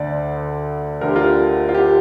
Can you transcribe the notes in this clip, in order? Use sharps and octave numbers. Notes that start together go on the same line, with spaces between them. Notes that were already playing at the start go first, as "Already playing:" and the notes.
Already playing: D2 D3 D5
D2 D3 A#4
G4
F4 A#4
F4
G4